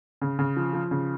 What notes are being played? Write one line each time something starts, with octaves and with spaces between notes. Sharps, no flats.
C#3
C#3
F3
F3
C#3